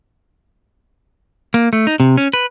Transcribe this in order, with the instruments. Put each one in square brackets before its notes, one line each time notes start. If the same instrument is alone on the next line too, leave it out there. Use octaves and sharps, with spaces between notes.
[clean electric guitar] A#3
A3
D#4
C3
C#4
B4